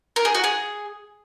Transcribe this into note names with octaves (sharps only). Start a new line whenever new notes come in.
A#4
G#4
F#4
G#4